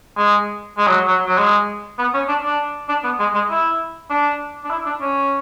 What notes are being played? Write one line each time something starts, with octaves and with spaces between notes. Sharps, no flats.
G#3
G#3
F#3
F#3
F#3
G#3
B3
C#4
D4
D4
D4
B3
G#3
G#3
E4
D4
D4
E4
D4
C#4